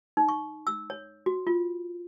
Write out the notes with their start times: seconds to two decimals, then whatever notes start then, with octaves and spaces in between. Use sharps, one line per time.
0.17 D#4
0.29 C#6
0.67 E6
0.90 C#5
1.26 F#4
1.47 F4